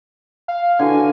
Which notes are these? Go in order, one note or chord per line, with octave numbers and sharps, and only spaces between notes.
F5
D3 E3 F#4 G#5